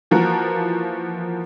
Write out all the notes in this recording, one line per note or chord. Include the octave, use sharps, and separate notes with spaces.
E3 F3 A#3 F#4 A#4